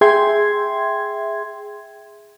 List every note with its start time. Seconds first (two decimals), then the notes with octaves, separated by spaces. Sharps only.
0.01 G#4 E5 G5 C6 G#6